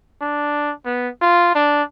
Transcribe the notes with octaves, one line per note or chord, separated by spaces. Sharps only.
D4
B3
F4
D4